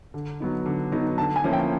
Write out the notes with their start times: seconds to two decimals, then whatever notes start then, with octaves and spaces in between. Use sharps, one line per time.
0.14 D3
0.40 F#3 B3 D#4
0.66 D3
0.92 F#3 B3 D#4
1.18 D3 A5
1.36 G#5
1.44 F3 A#3 C#4 E4
1.53 G5